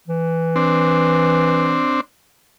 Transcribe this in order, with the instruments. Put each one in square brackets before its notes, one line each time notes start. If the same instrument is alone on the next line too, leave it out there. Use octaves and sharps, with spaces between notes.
[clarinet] E3
[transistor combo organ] C4 D4